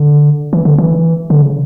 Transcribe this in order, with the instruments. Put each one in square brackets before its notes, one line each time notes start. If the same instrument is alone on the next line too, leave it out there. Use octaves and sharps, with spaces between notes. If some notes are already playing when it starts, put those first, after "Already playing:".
Already playing: [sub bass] D3
E3
D3
E3
D3
C#3